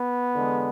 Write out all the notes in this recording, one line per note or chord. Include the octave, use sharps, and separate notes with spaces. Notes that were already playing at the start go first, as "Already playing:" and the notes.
Already playing: B3
E2 D3 G#3